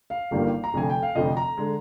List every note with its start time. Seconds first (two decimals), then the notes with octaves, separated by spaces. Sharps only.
0.10 F5
0.31 G1 G2 D#3 G3 A#3
0.64 A#5
0.74 F1 F2 D3 F3 G#5
0.90 G5
1.02 F5
1.15 F1 F2 D3 F3 D#5
1.37 A#5
1.58 D3 G#3